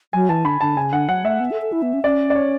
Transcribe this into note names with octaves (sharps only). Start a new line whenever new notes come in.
F#3 G#5
E3 A5
D3 B5
D3 A5
C#3 G#5
D3 F#5
F#3 F#5
A3 E5
B3
A4
A4
E4
B3
C#4
C#4 D5
D5
C#5